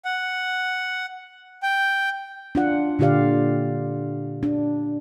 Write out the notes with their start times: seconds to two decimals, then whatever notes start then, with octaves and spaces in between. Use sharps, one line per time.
0.05 F#5
1.63 G5
2.55 D4 F4 F#5
2.99 A#2 D3 F4 G4 D5 F5
4.43 D4